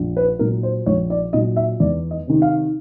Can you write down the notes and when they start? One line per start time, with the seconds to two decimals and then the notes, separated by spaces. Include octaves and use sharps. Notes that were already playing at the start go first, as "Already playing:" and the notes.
Already playing: A#1
0.17 B4
0.39 A#2 F#3 A#4
0.63 C5
0.86 A#1 C#5
1.10 D5
1.33 A#2 F#3 D#5
1.56 E5
1.80 E2 D5
2.11 D#5
2.27 C3 D#3
2.42 F5